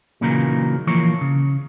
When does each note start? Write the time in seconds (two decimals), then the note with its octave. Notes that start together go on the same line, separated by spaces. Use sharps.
0.21 A#2 C#3 E3 F#3 A#3 D#4
0.87 E3 F3 A#3 C#5
1.21 C#3